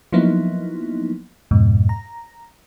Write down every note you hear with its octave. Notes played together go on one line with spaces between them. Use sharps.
F3 F#3 A#3 B3 D#4 E4
F2 G#2 B2
A#5